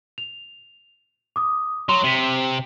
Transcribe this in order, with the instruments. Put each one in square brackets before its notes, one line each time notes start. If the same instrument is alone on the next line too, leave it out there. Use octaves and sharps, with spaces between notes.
[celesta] F7
D6 D#6
[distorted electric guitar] F#3 [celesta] C6
[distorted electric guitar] C3 [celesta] B6 D#7 F#7